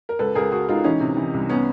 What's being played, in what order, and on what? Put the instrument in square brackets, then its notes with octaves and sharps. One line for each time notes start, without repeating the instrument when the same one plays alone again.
[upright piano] A#4
C#2 A4 B4
C#2 G#4 A#4
C#2 F#4 G#4
C#2 D#4 F4
E3 C#4 D#4
C3
E3
C2
B3 C#4